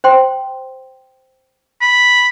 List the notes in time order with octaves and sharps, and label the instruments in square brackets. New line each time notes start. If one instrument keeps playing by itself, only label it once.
[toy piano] C5 G5 C6
[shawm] B5